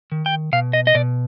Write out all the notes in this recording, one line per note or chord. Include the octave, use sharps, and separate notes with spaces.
D#3
G5
B2 F5
D#5
D#5
B2 D5